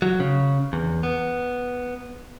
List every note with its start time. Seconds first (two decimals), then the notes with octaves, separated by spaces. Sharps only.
0.02 F#3
0.20 C#3
0.73 E2
1.03 B3